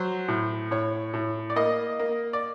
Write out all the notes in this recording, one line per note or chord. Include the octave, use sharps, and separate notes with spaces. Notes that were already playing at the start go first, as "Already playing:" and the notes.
Already playing: F#3 C5
A2
A2 C#5
A2
D5
A#3 D#5
A#3
D5